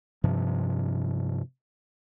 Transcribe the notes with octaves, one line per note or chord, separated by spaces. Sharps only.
G2 C3 F3